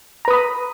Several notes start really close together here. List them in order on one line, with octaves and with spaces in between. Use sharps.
A#5 B4 D#6 B5